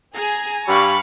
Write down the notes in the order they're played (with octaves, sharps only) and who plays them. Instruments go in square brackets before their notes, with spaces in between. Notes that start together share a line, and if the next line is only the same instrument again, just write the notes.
[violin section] G#4 [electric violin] G#5 A#5
[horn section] G2 G3 [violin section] F5 C#6 [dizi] B5